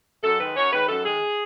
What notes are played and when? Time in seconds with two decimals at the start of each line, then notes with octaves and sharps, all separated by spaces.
0.23 F#2 A4
0.39 D#3 G#3 B4
0.56 F#2 C#5
0.72 D#3 G#3 B4
0.89 F#2 A4
1.05 D#3 G#3 G#4